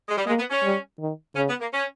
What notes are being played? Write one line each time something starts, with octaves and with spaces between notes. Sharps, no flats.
G#3
G3
G#3 A#3
B3
C#4
G3
D#3
C#3 C#4
B3
A#3
C#4